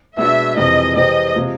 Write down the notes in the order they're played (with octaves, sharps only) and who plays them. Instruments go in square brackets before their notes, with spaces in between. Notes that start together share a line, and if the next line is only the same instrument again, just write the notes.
[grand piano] B2 G#3 B3 D4 F#4 [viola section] E5
[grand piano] F2 C3 E3 G#3 [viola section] D#5
[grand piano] C3 E3 G#3 C4 [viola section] D#5
[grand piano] C3 F3 G#3